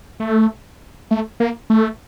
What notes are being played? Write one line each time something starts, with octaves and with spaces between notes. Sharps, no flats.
A3
A3
A#3
A3